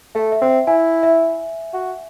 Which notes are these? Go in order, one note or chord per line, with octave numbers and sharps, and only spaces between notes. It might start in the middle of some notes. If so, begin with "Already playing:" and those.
A3 E5
E5
C4
E5
E4 G#5
E5
F#4